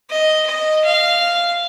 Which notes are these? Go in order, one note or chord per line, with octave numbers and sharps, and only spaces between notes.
D#5
D#5
F5